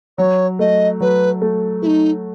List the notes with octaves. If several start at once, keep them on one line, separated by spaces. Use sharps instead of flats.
F#3 C#5
A3 D#5
F#3 B4
A3
A3 D#4 E4